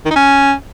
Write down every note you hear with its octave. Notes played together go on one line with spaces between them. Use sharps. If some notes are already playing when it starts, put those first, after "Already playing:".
D#3
D#4
C#4